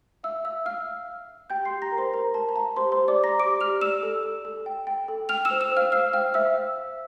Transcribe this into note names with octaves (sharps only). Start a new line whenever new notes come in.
E5 F5 E6
E5 F5 E6
F5 F6
F5
F5
F5
G4 G5 G6
C6 C7
G4
A#5 A#6
A#4
C5 C6
A#4 A#5
A#4 A5
A#5
F5 A5
G4 C5 C6
C5 C6
G4
D5 D6
D5 A#5 A#6
G4 D6 D7
G4 F6 F7
D5 E6 E7
A4
A4
A4
G5
G5
A4
G5 F6 F7
E6 E7
C5
E6 E7
C5 F5 F6
C5 F5 F6
F5 G5 F6
C5 E5 E6